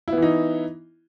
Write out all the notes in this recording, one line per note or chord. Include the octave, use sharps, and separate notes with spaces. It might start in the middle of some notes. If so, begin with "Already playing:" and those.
E3 B3 D#4 E4